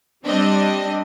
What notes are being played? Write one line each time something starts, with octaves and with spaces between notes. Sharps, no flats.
G3 C4 D4 D#5